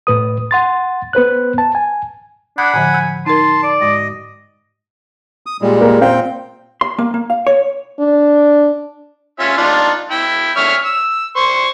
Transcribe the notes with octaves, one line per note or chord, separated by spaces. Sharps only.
A2 B4 D#6
F#5 C6 A6
B3 B4 C5 F#6
A5
G#5
D4 F#5 B5 D#6 G6 G#6
A2 D3 F3 G#5
E6 G6
D#4 A#4 A5 C6
D5
G#2 G#3 D#5
D#6
A#2 G3 G#3
A#3
A#2 C4 F5 G5
C6
A#3
A#3
F5
C#5
D4
C#4 F4 E5
D4 D#4 F4
E4 G5
C#5 E5 F6
E6
C5 C#6